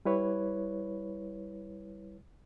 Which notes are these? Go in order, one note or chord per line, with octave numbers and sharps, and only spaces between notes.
G3 E4 B4 C#5